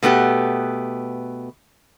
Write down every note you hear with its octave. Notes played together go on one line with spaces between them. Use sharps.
B2 A3 B3 G4